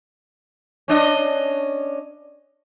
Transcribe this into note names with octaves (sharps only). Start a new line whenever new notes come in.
C#4 D4 D#5